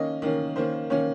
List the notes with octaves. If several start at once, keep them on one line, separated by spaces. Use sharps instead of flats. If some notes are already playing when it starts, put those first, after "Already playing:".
Already playing: D#3 A#3 C#4 D#5
D#3 A#3 C#4
D#3 A#3 C#4 C5
D#3 A#3 C#4 C#5